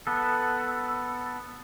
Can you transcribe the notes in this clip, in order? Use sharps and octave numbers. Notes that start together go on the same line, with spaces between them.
B3 A4